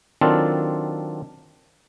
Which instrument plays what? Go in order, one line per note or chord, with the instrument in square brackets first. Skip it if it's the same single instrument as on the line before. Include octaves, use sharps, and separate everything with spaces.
[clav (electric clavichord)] D#3 F#3 C4 D4 F4 A4